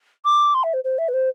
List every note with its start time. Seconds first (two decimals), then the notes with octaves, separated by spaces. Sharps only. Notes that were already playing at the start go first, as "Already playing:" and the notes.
0.25 D6
0.54 C6
0.63 E5
0.74 C5
0.84 C5
0.98 E5
1.08 B4
1.14 C5